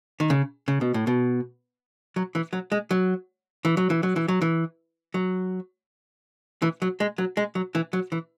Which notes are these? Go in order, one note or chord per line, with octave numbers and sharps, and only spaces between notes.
D#3
C#3
C#3
B2
A2
B2
F#3
E3
F#3
G#3
F#3
E3
F#3
E3
F#3
E3
F#3
E3
F#3
E3
F#3
G#3
F#3
G#3
F#3
E3
F#3
E3